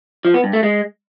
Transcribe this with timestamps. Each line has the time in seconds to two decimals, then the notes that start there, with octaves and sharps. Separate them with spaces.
0.25 F3
0.34 B3
0.44 G2
0.53 A3
0.63 G#3